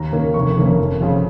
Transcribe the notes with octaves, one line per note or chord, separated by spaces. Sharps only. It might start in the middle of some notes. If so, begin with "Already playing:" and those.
Already playing: D#2 A#5
D#3 A#3 C#4
F1 C#6
F2 D#3 A#3 C#4
F1
F2 C#3 F3